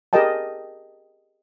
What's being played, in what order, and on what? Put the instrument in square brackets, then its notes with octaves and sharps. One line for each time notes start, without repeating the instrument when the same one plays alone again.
[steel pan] G4 G#4 A#4 D#5 G5 A5